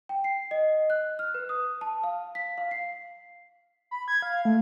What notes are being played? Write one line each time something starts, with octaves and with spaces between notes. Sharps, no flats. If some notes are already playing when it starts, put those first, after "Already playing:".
G5
C7
D#5
F#6
F6
B4
D#6
A5
F5
B6
F5
C7
B5
G#6
F5
A3